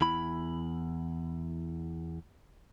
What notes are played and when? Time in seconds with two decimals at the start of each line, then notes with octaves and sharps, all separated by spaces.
0.01 E2 E4 B5